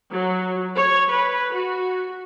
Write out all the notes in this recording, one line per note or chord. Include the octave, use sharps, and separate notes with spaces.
F#3
C#5
B4
F#4